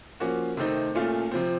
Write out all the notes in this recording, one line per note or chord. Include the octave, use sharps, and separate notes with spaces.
F3 A#3 C#4 F#4
C3 D#3 A3 C4 D#4
A#2 A3 C#4 F4
C3 F3 C4